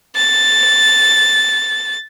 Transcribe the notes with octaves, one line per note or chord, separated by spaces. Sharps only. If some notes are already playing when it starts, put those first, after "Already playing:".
A6